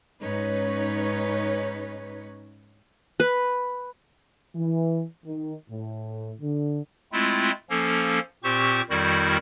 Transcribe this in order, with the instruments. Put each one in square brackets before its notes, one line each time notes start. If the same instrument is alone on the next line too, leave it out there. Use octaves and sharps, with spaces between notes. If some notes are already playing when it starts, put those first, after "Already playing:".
[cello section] G#2 C#4 D#4 B4 C#5
[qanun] B4
[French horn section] E3
D#3
A2
D3
[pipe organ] G#3 A3 C4 E4 F4
F3 A#3 C#4 A4
A#2 C4 G4 C5 C#6
F2 D#3 G3 E4 F#4 G6